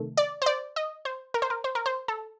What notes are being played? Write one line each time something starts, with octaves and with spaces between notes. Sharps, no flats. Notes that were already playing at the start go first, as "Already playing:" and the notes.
Already playing: C3 D#3 A3
D5
C5
D5
D#5
C5
A#4
C5
A#4
C5
A#4
C5
A4